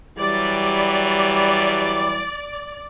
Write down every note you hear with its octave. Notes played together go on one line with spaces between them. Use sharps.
E3 F#3 G3 D5